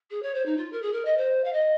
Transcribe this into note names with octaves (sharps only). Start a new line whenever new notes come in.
G#4
C#5
C5
D#4
F4
A#4
G#4
A#4
D#5
C5
F5
D#5